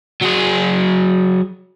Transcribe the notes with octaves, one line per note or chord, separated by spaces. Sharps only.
F#3 G#4